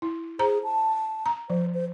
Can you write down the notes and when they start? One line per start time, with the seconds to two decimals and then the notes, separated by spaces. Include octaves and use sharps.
0.02 E4
0.39 G#4 C5 A#5
0.64 A5
1.26 A#5
1.50 F3 C5
1.74 C5